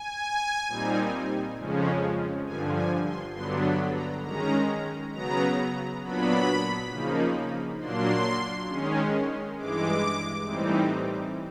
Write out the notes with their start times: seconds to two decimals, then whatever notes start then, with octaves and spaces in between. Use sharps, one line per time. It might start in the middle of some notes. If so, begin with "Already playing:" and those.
Already playing: G#5
0.68 A#2 G3 C4 D#4
1.57 F2 C#3 F3 G#3 C#4
2.46 G2 D3 F3 G#5
2.76 G#5
3.05 C6
3.35 G2 D3 F#3 B3 D4 C6
3.65 B5
3.94 A#5
4.23 D#3 G#3 C#4 A#5
5.13 C#3 F#3 B3 A#5
6.02 A#2 F#3 B3 D4 B5
6.91 C#3 F3 A#3 D#4
7.80 A#2 F#3 A#3 D4 C6
8.69 D#3 G#3 C#4
9.58 G2 E3 G#3 D6
10.46 A2 E3 G3 C4 D#4